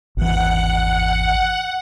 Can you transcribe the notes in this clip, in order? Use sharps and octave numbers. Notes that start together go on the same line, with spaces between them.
G#1 E2 E3 F#5